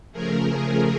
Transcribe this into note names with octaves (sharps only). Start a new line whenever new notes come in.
C#3 F3 A3 G#4 A#4
G#4 A#4